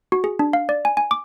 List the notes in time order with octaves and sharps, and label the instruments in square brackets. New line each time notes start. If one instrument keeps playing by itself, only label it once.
[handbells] F#4
G#4
D4
F5
D5
G#5
G#5
D6